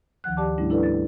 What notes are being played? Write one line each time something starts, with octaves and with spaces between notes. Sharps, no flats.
D2 D#3 F3 F#5 F#6
G4 D5 A5 D6
G#2 G3 A3 C#4 D4 E4
D4 E4 A4 B4 D5
A6